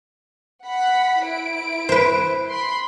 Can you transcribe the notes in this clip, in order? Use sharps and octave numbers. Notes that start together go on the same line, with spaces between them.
F#5 B5
E4 D7
B4 C5
B5 C6